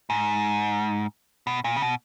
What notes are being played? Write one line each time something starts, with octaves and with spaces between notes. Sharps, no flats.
G#2
B2
A#2
C#3
B2